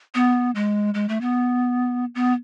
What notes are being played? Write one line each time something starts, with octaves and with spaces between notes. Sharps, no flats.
B3
G#3
G#3
A3
B3
B3